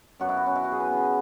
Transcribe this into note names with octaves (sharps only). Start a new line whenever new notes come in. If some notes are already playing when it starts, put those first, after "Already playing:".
F#2 F#3 B3 F#4
E4
F#4
C#4
E4
F#4
G#4
B4
C#3 E3 B3